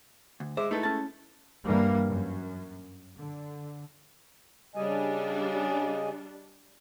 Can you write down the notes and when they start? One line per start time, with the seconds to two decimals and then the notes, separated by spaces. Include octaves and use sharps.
0.40 D2
0.57 G#3 C5 E5 D6
0.71 G#3 A3 D#4 E4 A4 B4
0.83 C#4 A5
1.65 G2 E3 G3 A#3
2.09 F#2
3.15 D3
4.75 C#3 G3 D4 D#5 G#5